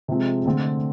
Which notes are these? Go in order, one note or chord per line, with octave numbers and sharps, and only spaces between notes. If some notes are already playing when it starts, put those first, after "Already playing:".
C3 F3 G#3 C4
D3 A3 C4